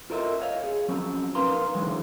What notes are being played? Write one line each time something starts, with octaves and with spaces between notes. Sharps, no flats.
F4 A4 A#4 C5 D#5 E5
C#5 D#5 F5
G#4 C#5
F3 F#3 C4 C#4
D#4 A#4 B4 F5 A#5 C6
D3 E3 F#3 G#3